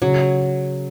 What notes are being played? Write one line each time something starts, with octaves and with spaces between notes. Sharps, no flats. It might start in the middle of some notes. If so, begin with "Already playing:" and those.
C#3 F#3